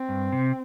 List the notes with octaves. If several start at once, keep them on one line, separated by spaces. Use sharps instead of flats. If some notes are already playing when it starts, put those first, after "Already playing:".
Already playing: C4
G2
C3